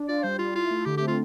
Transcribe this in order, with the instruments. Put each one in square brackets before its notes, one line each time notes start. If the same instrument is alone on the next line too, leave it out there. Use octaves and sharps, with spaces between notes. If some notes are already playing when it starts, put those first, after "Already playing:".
Already playing: [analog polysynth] D4
[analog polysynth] F4 [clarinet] D5
[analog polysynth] G3 [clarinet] C5
[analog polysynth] G3 [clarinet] F4
[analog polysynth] E4 [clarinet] F4
[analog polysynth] A3
[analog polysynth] D3 [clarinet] G4
[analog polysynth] C4 [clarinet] G4
[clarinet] F4